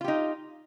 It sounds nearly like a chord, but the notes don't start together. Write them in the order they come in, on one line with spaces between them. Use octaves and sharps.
F4 G4 D#4